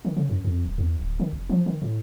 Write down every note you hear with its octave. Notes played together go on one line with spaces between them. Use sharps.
D#3
C#3
F#2
F2
D#1
E2
D1
D#3
F1
F3
D#3
A2